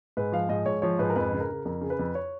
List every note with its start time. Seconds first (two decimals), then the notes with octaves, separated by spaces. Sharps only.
0.17 G#2 B4
0.32 F3 F5
0.49 G#2 D#5
0.66 G#2 C#5
0.82 F3 C#5
0.99 G#2 B4
1.10 A#4
1.16 F2 B4
1.32 C#3
1.40 A#4
1.49 C#3
1.65 F2 A#4
1.81 C#3
1.90 B4
1.99 F2
2.15 C#5